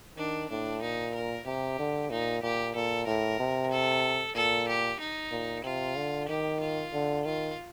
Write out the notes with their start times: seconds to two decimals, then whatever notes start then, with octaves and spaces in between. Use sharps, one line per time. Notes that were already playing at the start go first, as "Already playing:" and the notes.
0.18 D#3 D4
0.50 A2 D4
0.82 A#2 D#4
1.14 A#4
1.46 C3 G4
1.79 D3
2.10 A#2 D#4
2.43 A#2 G4
2.75 A#2 A4
3.07 A2 A#4
3.40 C3
3.71 A4
4.35 A#2 A4
4.68 G4
5.00 D#4
5.31 A#2
5.64 C3 F4
5.96 D3
6.28 D#3 G4
6.60 F4
6.93 D3
7.25 D#3 F4